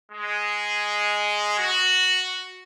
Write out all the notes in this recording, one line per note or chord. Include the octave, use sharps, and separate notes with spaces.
G#3
F#4